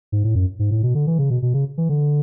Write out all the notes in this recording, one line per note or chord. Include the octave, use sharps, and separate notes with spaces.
G#2
A2
F#2
G#2
A2
B2
D3
E3
C#3
B2
B2
C#3
E3
D3